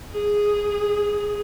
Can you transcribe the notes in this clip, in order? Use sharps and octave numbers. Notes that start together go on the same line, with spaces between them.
G#4